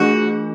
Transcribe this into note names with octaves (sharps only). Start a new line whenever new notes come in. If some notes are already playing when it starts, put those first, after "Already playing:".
Already playing: E3 A3 D4 F4 F#4 G#4